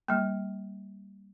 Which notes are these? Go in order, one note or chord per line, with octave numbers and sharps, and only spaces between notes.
G3 A#3